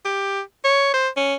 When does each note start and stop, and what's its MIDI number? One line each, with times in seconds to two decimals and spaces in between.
0.05 0.41 67
0.64 0.92 73
0.94 1.08 72
1.16 1.35 61